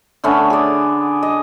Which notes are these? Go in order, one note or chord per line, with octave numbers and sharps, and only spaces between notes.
D3 A3 B3 C#4
G#4 D5
D#5